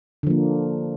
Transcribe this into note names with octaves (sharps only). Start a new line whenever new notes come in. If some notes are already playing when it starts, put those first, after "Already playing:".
D3 F3 A#3